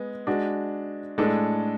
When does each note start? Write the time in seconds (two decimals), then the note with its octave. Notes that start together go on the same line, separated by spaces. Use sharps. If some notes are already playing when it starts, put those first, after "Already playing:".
Already playing: G#3 B3
0.27 G#3 D4 F#4
1.18 A2 G#3 D4 A4